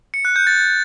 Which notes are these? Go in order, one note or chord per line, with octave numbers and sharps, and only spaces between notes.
C#7
F#6
G6
A6